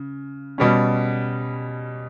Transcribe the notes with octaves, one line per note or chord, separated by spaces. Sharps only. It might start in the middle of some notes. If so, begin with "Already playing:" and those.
Already playing: C#3
B2 G3 C#4